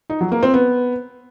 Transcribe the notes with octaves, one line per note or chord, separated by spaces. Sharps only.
D#4
F#3
A#3
C4
B3